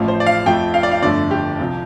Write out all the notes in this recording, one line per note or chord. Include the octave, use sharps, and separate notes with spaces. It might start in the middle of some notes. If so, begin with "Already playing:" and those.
Already playing: A1 A2 F3 A3 F5
C5
D5
F5
F2 F3 A3 G5
F5
D5
F5
G1 F2 D3 F3 A3 D5
G4
C2 C3 F3